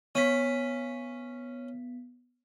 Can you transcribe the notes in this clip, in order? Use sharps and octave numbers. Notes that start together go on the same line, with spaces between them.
B3 C#4 B6